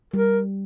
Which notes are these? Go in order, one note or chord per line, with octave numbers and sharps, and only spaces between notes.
G3 A#4